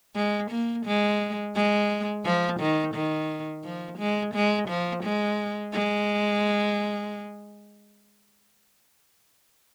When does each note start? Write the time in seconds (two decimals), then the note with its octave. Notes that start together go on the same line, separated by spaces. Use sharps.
0.16 G#3
0.51 A#3
0.86 G#3
1.56 G#3
2.25 F3
2.60 D#3
2.95 D#3
3.64 F3
3.99 G#3
4.35 G#3
4.69 F3
5.03 G#3
5.73 G#3